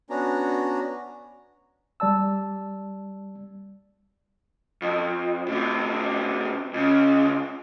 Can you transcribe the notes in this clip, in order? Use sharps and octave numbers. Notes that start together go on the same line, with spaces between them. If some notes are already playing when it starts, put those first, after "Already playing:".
B3 C#4 D4 F#4 A#5
G3 D5 A5 E6
F2
A2 C3
C#2 C#3